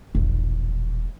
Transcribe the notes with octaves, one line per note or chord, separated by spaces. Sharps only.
E1 A#1